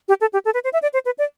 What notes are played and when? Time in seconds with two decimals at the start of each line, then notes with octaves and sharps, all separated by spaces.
0.08 G4
0.21 A4
0.33 G4
0.45 A4
0.54 B4
0.64 C5
0.73 E5
0.82 D5
0.94 C5
1.06 B4
1.18 D5